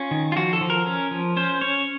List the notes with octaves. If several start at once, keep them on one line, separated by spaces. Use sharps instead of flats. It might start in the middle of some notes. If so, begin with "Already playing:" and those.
Already playing: C#4 F4
D#3
F4
F3 F#4
A4
F3
A#4
C#4
F3
C#4 C5
C#4 C#5